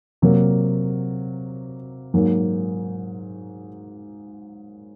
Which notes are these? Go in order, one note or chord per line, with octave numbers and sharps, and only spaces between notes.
C3 F#3 A#3
G#2 F#3 A#3